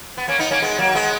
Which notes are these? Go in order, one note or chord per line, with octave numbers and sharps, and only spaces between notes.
B3
A#3 C#4
B3 D#4
A#3 C#4
G#3 B3
F#3 A#3
G#3 B3